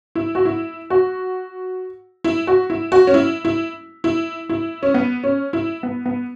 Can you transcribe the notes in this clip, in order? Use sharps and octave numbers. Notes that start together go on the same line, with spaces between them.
E4
F#4
E4
F#4
E4
F#4
E4
F#4
C#4
E4
E4
E4
E4
C#4
B3
C#4
E4
B3
B3